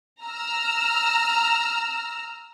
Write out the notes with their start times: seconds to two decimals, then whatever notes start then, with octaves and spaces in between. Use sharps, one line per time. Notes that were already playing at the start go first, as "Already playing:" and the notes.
0.23 A#5 E6 F6